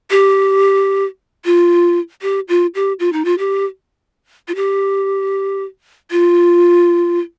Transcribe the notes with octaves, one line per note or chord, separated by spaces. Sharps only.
G4
F4
G4
F4
G4
F4
D#4
F4
G4
F4
G4
F4